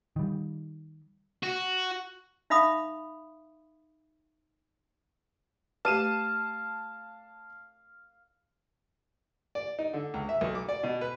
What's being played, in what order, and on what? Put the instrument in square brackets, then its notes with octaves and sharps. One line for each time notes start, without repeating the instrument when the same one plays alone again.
[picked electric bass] D#3 G3
[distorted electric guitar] F#4
[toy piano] D#4 E5 F5 B5 D#6
[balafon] A3 G4 B4 [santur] F5 [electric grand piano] A5 D#7 E7
[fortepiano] D5
D#4
D3
C#2
E5
B1
D6
D5
B2
B4